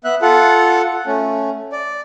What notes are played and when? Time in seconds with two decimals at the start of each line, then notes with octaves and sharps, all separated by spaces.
0.04 B3 E5 F#6
0.22 F4 A4 F#5
1.07 A3 C#4
1.72 D5